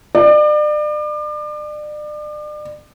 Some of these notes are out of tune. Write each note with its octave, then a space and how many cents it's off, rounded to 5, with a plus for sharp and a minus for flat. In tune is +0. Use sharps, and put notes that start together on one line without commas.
D5 +35